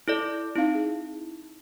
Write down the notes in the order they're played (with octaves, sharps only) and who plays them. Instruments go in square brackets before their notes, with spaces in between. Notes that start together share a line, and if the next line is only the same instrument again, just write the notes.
[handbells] E4 A4 D5
[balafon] C4 D#4 F5 [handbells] E4
[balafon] G#4